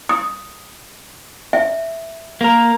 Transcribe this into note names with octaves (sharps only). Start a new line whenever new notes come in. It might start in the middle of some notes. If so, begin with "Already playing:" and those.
D#6
E5
A#3 A#4